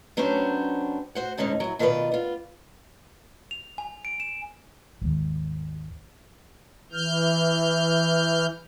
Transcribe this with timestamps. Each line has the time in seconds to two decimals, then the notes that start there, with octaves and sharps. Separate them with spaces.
0.17 F#3 B3 C#4 D4 G4 C5
1.15 F#4 C5 F#5
1.37 D2 G#2 D3 C#4 D#4
1.60 F#3 E4
1.79 B2 D#3 F4 G#4 B4 D5
2.12 B3 F4
3.51 F7
3.78 G#5
4.05 D7
4.20 E7
5.01 G#1 D#2
6.92 E3 F6 G6